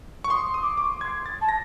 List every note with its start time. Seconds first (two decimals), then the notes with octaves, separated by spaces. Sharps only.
0.24 C#6
0.30 C6 D#6
0.54 D#6
0.63 D6
0.77 C#6 D6
1.01 C6 G#6
1.26 A6
1.41 A5
1.49 A#6